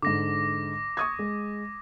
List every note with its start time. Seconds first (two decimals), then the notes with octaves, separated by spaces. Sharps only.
0.02 G#2 D3 D6 A#6
0.97 C#6 D#6 G#6
1.19 G#3